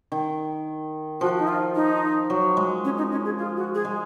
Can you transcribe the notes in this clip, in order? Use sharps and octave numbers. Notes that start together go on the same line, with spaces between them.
D#3
F3 F#4
D#4
F4
D#4
F#3
G#3
C#4
D#4
C#4
G#4
F4
F#4
G#4
G#3